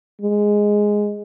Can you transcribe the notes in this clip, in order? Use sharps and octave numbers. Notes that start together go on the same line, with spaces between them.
G#3